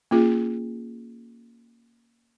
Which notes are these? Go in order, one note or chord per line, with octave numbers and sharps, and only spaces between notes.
A#3 C#4 F4 G#4